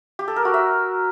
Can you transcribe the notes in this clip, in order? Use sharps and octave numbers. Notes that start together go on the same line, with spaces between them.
G4
A4
A#4
F#4
E5